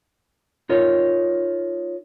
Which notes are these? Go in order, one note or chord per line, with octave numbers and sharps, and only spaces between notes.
D#4 F4 A#4 C#5